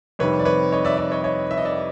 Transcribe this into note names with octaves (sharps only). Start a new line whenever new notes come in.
F2 C3 D#3 G3 B4 C#5
D5
B4 C#5
C#5 D#5
D5 E5
D5 E5
C#5 D#5
C#5 D#5
E5
D#5
D5 E5